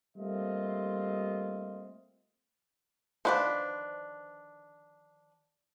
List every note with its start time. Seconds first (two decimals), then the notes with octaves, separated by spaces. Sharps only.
0.17 G3 A3 A#3 C4 F4 D#5
3.25 D3 D#3 F3 D4 B4 C5